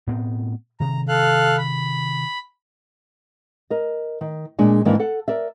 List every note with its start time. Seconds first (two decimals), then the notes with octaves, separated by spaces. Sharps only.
0.07 A2 B3 C4
0.80 C3 D#3 A#5
1.08 A4 F5 F#6
1.58 B5
3.70 A#4 D#5
4.21 D#3
4.59 A#2 G#3 D4 G#5
4.85 G#2 D#3 E3 A#3 D4
4.99 A4 F#5
5.28 A#4 D5 E5